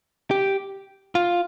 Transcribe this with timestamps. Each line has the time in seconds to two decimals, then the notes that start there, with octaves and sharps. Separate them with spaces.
0.31 G4
1.15 F4